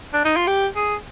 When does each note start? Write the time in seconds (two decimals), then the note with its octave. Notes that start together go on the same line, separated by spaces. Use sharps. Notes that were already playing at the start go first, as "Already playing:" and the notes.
0.14 D4
0.25 D#4
0.36 F4
0.47 G4
0.76 G#4